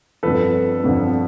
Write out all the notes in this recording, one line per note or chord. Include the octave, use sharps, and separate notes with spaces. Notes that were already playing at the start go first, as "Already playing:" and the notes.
G1 F2 D3 F3 A4 B4
G1 F2 D3 F3